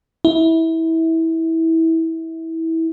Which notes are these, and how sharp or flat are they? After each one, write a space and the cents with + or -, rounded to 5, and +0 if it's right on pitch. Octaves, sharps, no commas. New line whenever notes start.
E4 -20